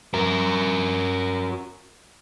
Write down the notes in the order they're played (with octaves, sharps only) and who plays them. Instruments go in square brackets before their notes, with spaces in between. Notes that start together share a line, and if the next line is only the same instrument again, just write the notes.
[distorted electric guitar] F#4 A#4